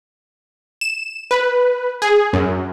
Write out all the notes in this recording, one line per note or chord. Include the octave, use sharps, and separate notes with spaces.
E7
B4
G#4
F#2